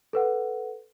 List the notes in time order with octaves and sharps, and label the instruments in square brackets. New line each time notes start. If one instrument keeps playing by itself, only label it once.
[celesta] A4 B4 F#5